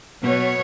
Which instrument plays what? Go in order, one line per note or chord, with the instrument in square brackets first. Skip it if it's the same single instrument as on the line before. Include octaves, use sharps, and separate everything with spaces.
[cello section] B2 F#3 B3 C#5